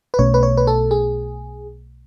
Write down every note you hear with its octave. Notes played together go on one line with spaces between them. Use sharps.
B4
B1 B2 A3 C#4 C#5
B4
C#5
B4
A4
G#4